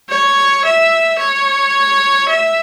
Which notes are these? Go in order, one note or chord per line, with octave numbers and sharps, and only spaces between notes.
C#5
E5
C#5
E5